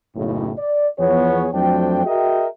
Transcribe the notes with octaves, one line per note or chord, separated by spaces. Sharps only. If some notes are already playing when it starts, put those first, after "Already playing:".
F#1 B1 A2 C#3
D5
E2 F3 B3 G#4 C#5
F2 F#3 A3 D4 C5 G5
F#4 G#4 A#4 D#5 E5 G5